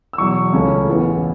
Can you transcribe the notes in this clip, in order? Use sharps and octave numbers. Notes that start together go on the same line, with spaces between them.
E6
E2 B2 F#3 C#6
C#2 C#3 A3 C#4
A1 A2 E3 B3